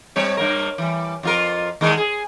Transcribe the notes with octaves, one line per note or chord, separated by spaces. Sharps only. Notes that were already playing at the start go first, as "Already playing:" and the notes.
G3 C4 C#5
G2 A#3 A#4
E3 G3
F2 F4 A#4
D#2 G#3 A#4
G#4